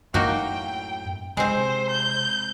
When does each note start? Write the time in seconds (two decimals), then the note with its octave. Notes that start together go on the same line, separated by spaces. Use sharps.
0.14 F#2 A2 A#3 D#4 F#4 G5
1.37 C3 G#3 C4 C5
1.90 G6